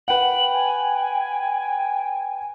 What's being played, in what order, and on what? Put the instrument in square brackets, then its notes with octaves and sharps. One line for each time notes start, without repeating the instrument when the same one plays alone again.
[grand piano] B4 F#5 [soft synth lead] G5 [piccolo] F#7
[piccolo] G#5